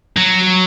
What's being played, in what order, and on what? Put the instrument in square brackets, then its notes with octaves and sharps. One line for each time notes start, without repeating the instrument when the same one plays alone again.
[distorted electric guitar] F#3